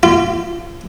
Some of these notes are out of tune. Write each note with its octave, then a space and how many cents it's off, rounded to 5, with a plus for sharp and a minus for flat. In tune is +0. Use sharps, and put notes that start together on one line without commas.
F4 -35